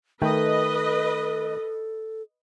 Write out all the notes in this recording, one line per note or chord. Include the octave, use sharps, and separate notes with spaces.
D#3 A3 A4 B4 D#5 G5